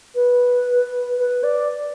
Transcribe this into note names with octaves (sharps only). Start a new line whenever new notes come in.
B4
B4
D5